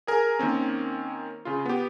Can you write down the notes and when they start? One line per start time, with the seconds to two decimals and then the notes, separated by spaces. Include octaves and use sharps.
0.07 G#4 A#4 G#5
0.39 D#3 A#3 C4 C#4
1.45 C#3 F4
1.66 B3 G4